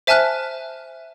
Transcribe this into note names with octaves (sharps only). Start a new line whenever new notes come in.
C5 E5 G#5 A5 F6 F#6